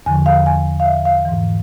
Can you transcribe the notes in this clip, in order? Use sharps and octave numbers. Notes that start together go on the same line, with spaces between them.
E2 D3 F3 G#5
F5
G#5
F5
E5
F5
G#2 E3